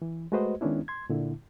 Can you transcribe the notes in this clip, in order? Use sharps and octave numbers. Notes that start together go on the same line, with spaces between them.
E3
G#3 A3 F#4 B4 C5 D#5
D#3 G#3 B3 C#4 D4 E4
C6 G#6
A#2 D3 E4